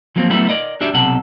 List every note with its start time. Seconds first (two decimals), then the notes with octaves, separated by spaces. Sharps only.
0.16 F3 F#3 A#3 C4
0.30 F#3 G3 A3 B3 E4
0.49 A#4 D5 D#5
0.81 D4 F#4 G4 D5 E5
0.94 B1 C3 A4 F#5